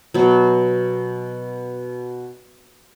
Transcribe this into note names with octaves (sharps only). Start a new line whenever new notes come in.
B2 F#3